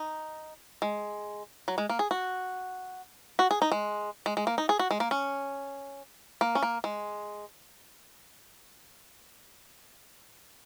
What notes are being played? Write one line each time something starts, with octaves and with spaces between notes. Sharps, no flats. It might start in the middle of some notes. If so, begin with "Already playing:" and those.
Already playing: D#4
G#3
F#3
G#3
A#3
G#4
F#4
F#4
G#4
D#4
G#3
G#3
G#3
A#3
D#4
G#4
F#4
G#3
A#3
C#4
A#3
C#4
A#3
G#3